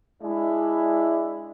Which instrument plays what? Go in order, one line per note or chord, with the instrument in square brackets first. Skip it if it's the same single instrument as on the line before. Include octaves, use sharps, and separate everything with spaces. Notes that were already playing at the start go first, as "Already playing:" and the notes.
[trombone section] G#3 D4 E4